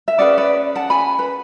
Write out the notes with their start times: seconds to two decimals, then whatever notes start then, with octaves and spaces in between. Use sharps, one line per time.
0.08 E5
0.19 C#4 G#4 B4 D5 F#5
0.38 B4 D5
0.75 F#5 A5
0.90 G#5 B5
1.19 B4